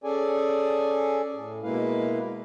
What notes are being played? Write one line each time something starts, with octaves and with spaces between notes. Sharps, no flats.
C#4 G#4 A4 D5 G#5
A2
B2 G#3 A#3 E4 B4 F5